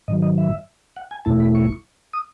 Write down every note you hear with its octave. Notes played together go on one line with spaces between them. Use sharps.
G#2 D#3 F#3 D#5
D#5
E5
F#5
G#5
E2 B2 A3 E4 A5
B5
C#6
D#6